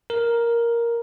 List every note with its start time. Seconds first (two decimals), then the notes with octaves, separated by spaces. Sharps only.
0.10 A#4